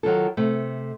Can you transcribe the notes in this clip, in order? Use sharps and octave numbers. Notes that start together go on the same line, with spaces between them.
D#3 F#3 F4 A4
C3 A3